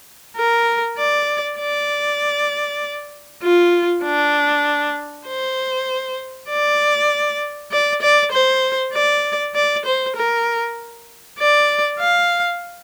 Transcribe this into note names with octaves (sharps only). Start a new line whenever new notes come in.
A#4
D5
D5
F4
D4
C5
D5
D5
D5
C5
D5
D5
C5
A#4
D5
F5